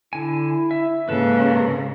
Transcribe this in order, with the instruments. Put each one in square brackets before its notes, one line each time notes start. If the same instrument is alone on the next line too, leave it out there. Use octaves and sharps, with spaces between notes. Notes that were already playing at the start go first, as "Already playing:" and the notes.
[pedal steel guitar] D3 G#5 [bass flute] E4
[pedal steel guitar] E5
[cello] G#2 C#3 [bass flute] A#3 [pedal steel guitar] A4 B4